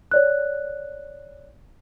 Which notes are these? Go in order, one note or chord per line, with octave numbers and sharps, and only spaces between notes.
C#5 D5 F#6